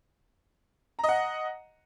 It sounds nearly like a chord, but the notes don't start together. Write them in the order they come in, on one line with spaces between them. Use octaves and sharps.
A#5 D#5 F#5